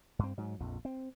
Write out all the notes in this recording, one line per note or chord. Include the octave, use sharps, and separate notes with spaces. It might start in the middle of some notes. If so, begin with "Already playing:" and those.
G2 C4
G#2 F#3
A#1 F2
C4